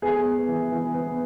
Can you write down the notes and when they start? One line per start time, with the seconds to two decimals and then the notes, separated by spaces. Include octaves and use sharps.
0.02 B3 G#4
0.26 B3
0.48 E3
0.72 E3
0.95 B3